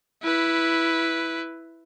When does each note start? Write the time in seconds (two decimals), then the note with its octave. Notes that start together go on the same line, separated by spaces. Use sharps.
0.23 E4 B4